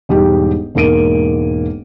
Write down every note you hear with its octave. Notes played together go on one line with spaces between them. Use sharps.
E1 G#2 G3 D#4 G4
E1 G#2 A#3 D7 D#7